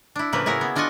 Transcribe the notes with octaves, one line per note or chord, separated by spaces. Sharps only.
D4 E4
A2 C#3 F3 A#3 B4
E4 F#4 G#4 A#4
B3
D4 F4 F#4 D#5 F#5 G#5